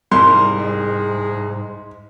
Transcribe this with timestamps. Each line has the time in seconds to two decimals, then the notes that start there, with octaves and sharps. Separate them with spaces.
0.12 C2 G#2 A#4 C6
0.59 G#3